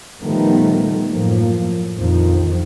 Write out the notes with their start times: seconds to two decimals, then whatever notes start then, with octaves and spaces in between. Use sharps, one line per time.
0.22 A#2 D#3 F3 G3 A3 B3
1.08 F#2 A2 F3 A#3
1.95 A#1 F2 D#3 F3